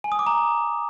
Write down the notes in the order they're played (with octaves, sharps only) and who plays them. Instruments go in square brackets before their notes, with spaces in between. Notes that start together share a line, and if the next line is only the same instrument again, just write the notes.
[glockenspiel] G#5
D#6
D6
A#5